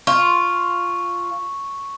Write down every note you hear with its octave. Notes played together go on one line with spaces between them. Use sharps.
F4 C#6